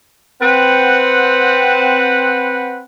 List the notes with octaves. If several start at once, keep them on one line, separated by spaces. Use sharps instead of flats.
C4 B4 F#5